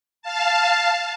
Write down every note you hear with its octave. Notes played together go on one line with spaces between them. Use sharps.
F5 A5